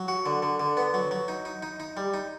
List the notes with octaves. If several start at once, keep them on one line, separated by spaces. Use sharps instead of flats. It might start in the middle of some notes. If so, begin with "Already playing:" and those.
Already playing: F#3
F#4
D3
D3
D3
B3
F#3
F#3
D#4
D#4
D#4
D#4
G3
D#4